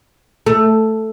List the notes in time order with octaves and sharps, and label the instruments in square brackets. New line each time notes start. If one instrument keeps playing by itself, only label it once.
[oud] A3